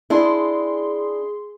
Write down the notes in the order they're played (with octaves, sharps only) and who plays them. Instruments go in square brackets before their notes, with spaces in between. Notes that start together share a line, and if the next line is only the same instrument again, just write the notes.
[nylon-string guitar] D4 E4 [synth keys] G#4 C6